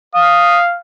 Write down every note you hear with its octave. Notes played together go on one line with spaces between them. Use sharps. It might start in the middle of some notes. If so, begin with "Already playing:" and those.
F5 D#6